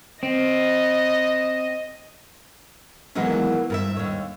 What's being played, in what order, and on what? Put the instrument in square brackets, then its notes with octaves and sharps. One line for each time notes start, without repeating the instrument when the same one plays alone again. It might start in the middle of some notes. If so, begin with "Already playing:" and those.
[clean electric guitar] C4 [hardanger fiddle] D#5
[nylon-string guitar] D#3 E3 F#3 G#3 A#3 B3
G2 A#4 E5
D#2 C#5